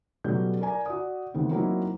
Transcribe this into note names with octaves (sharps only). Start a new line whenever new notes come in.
B2 F#3 G3 C#4 A4 G6
A#4 D5 G#5 A#5
F#4 D5 D#6
D#2 E3 A3 B3 C4
F#3 A#3 C4 D#4 E4 F#4